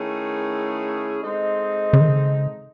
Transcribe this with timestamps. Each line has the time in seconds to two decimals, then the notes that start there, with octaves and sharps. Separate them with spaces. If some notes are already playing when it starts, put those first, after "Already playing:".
Already playing: D#3 A3 C#4 E4 G#4
1.22 G#3 C4 D#4 A4 D#5
1.93 C#3
2.01 D#3
2.09 C#3